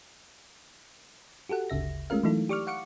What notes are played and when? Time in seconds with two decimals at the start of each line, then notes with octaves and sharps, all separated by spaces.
1.49 F#4 G4 A4 F#5
1.70 G1 D2 C#3 E5 A#6
2.10 G#3 A3 C#4 F4 A#4 F5
2.23 E3 F#3 A3 D#4 E4 A4
2.49 G4 D5 C#6 D6 F6
2.67 F5 F#5 C#6 D6 C#7